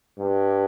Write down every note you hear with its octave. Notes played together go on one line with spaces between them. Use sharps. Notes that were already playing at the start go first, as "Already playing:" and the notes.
G2